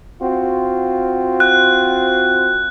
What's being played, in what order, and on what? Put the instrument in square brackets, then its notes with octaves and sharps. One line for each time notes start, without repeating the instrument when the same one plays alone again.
[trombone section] C4 F4 F#4
[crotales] F#6